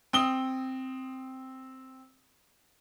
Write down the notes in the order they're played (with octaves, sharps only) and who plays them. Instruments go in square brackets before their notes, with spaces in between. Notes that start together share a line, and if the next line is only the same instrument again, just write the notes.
[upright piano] C4 D#6 G7